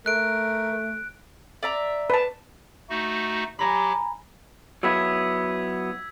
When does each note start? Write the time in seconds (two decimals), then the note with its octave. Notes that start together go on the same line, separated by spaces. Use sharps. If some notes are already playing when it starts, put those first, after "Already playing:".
0.06 A3 A#4 F#6 D7
1.63 D5 E5 A#5
2.10 B4 A5
2.90 A3 D#4 F#4
3.59 F#3 G4 G#5 A#5 B5
4.83 F#3 B3 E4 E6 G#6 B6